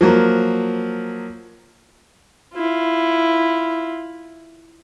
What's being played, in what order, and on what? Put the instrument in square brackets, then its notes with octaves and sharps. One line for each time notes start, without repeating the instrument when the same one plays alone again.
[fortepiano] F3 F#3 A#3
[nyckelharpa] E4 F4